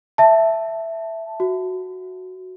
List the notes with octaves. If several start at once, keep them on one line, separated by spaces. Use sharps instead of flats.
E5 A5
F#4